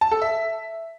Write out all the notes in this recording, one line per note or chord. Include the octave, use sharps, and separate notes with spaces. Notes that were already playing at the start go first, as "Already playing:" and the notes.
A5
A4
E5